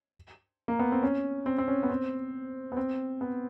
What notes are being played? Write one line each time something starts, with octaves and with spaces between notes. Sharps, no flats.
A#3
B3
C4
C#4
C4
C4
C#4
B3
C4
B3
C4
B3